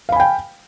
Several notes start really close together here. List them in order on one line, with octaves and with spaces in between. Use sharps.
F5 B5 G#5 G5